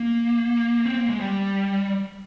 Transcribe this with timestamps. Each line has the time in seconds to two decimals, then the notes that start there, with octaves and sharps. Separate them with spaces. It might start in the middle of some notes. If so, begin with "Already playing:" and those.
Already playing: A#3
0.86 C4
0.98 A#3
1.09 G#3
1.20 G3